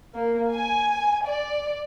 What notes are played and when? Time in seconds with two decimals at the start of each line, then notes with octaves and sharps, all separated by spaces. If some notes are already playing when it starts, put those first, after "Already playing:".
0.15 A#3
0.50 G#5
1.26 D5